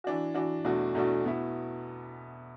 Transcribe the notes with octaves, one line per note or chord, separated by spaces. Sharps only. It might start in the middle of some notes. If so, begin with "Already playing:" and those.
E3 D4 F#4
E3 D4 F#4
E2 B2 A3 D4 F#4
E2 B2 A3 D4 F#4
B2 B3 E4